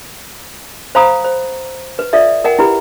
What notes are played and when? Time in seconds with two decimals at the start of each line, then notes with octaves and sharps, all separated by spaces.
0.95 C5 F5 A#5 B5 D#6
1.24 C5
1.99 B4
2.13 F4 A4 D5 E5
2.44 A#4 D#5 F#5 G5
2.59 E4 G4 B4 B5